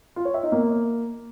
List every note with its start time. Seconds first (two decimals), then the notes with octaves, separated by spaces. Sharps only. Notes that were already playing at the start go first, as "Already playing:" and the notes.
0.16 F4
0.25 C#5
0.34 E5
0.43 D#4
0.52 A#3